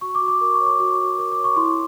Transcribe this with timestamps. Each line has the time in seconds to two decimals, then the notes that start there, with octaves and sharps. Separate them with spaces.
0.01 F#4 C#6
0.15 D6
0.21 F#4
0.28 D6
0.40 A#4 C#6
0.54 C#6
0.60 C#5
0.66 D6
0.79 F#4 C#6
0.99 F#4
1.18 A#4 D6
1.32 D6
1.38 C#5
1.44 C#6
1.56 E4 C6